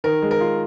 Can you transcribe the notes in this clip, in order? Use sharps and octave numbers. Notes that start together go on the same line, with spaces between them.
D#3 A#4
G#3
A#4
F4